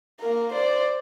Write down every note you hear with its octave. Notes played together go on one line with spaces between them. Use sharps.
A#3 A#4
C5 D5